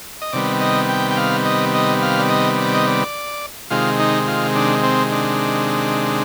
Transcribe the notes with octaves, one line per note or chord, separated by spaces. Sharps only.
D#5
C3 D#3 G3 B3 D5
D#5
G5
G5
F5
D#5
D#5
F5
D5
D#5
D5
D#5
D5
C3 D#3 G#3 F4
D#4
F4
D4
C4
D4